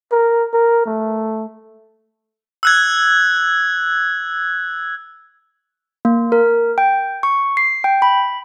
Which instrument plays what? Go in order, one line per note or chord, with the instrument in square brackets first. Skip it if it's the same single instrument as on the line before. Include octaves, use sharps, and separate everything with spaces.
[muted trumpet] A#4
A#4
A3
[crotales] E6 F#6 G#6
[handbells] A#3
A#4
G5
C#6
C7
G5
B5